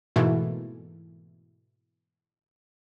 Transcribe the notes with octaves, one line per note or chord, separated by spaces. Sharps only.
G#2 B2 E3 A3 A#3